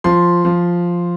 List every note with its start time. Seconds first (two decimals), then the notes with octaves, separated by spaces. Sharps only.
0.04 F3 C6
0.45 F3